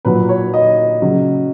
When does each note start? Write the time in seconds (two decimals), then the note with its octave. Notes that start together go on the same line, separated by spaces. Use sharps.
0.05 A#2 F#3 B4
0.29 C#5
0.54 D#5
1.02 C#3 F#3